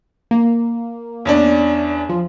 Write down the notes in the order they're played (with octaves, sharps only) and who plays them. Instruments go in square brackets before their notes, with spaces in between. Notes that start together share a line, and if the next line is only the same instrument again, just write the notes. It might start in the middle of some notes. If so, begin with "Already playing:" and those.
[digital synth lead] A#3
[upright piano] E2 C#4 D4
[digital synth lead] F3